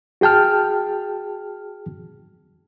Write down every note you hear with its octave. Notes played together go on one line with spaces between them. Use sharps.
F#4 G#4 G5 A5 F6